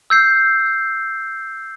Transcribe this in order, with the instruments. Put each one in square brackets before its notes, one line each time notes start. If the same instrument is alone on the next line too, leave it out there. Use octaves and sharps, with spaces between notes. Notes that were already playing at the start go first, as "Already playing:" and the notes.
[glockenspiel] E6 G6 C7